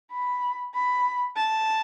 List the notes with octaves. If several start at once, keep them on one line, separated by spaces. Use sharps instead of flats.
B5
B5
A5